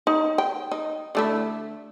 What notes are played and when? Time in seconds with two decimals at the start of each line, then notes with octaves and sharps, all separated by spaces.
0.07 D#4
0.38 G5
0.72 D#4
1.15 D3 A3 E4